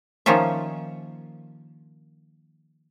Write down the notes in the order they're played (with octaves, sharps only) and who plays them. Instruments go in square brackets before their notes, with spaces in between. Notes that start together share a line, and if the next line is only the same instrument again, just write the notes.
[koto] D#3 F3 A#3 C#4 F4 E5